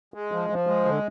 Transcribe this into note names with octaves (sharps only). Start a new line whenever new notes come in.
G#3
F3
F3
G#3
D3